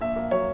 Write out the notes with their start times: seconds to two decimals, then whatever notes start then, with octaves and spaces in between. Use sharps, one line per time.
0.01 A#1 E5
0.16 A#3
0.31 F#3 C#5